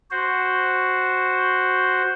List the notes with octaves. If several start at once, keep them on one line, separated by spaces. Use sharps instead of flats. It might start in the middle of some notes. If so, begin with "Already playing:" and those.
F#4 C5